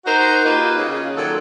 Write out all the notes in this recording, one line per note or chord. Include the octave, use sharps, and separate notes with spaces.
D#4 F#4 A#4 C5
A#3 D#4 F4 G4 B4
C#3
A#2 D#3 F#3 A4